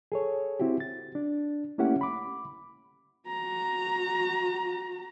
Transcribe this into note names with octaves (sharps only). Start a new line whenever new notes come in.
G#4 A4 C#5
C4 E4 F#4 G4
A6
D4
A3 A#3 C#4 E4 G4 F#5
B5 D6
F#4 A#5